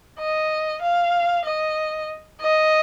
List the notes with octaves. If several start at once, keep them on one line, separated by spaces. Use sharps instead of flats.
D#5
F5
D#5
D#5